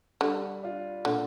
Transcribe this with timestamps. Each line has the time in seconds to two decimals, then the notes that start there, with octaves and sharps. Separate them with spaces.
0.21 D3 G3
0.63 D4 F4
1.05 A#2 D3